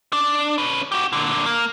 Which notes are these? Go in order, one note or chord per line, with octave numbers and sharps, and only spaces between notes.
D4
C#4 B4
F#4 G4
A#2 D3
A#3